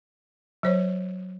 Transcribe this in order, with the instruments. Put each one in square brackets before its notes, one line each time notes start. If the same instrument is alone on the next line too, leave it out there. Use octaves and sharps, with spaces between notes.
[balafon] F#3 C5 C#5